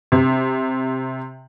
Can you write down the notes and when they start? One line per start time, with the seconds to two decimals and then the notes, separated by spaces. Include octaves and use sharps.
0.12 C3